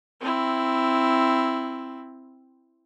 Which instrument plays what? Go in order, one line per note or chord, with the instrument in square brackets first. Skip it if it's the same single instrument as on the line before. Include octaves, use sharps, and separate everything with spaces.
[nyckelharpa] C4 E4